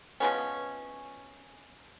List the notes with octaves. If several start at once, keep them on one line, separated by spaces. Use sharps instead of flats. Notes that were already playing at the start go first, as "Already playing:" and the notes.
F3 G#3 B3 C#4